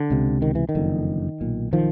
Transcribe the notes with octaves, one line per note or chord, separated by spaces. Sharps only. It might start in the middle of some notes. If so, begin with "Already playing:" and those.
Already playing: D3
C#2 C3
D#3
E3
D#3
F#1 F2 D3
B1 A#2
D#3 F3